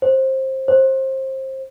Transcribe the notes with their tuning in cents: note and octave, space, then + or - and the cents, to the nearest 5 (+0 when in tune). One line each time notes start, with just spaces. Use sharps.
C5 +20
C5 +25